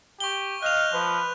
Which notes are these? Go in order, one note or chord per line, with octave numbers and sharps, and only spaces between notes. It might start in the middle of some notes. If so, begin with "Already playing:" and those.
G4 C#6 G7
D#5 F5 F#6 G6 F7
F3 B4